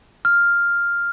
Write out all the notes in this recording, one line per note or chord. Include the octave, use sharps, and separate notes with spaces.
F6